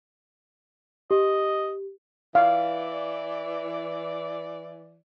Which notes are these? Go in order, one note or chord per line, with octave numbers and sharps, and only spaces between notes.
G4 D#5
E3 D5 F5